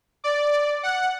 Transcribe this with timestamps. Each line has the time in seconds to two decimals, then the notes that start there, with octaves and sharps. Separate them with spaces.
0.24 D5
0.83 F#5